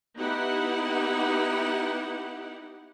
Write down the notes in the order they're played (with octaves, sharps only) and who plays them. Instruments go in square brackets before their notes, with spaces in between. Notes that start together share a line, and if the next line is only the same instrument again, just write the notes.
[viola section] B3 D#4 E4 G4 F#5